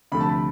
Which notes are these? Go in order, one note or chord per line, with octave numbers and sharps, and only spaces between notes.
D2 C3 F3 A3 B5
A5
B5